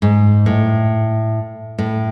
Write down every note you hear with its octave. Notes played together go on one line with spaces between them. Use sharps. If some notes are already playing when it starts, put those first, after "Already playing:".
G#2
A2
A2